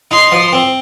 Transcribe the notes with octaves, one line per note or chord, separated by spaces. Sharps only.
D#4 C6
F3
C4